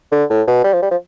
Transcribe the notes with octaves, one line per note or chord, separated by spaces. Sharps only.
D3
A2
B2
G3
F3
G3
F3